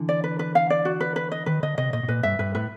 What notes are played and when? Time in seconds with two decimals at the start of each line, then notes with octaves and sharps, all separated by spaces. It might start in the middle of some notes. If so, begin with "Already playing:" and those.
Already playing: D3 E3
0.09 D5
0.24 B4
0.39 B4
0.55 F5
0.70 D5
0.85 F#4
1.01 B4
1.16 B4
1.32 D#5
1.46 D#3 B4
1.63 D3 D#5
1.78 C3 D#5
1.93 A#2 D#5
2.03 B2
2.08 A#2 B4
2.23 G2 E5
2.39 G2 B4
2.55 A2 B4